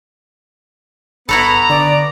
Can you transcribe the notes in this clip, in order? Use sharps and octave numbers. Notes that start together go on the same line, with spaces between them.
G1 B3 E4 F#4 A4 A#5 B5
D3 D5